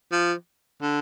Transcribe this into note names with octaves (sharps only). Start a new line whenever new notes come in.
F3
D3